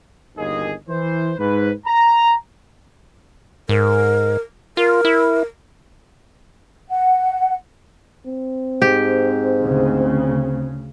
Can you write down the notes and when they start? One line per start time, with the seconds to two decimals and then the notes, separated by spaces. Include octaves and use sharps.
0.37 G1 D#2 G#4 D#5
0.88 E3 C5
1.38 G#2 B4
1.86 A#5
3.69 G#2 A#4
4.77 F4 A#4
5.05 E4
6.90 F#5
8.26 C4
8.82 G#2 G4
9.62 D2 C#3